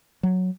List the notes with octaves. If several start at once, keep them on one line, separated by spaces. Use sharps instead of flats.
F#3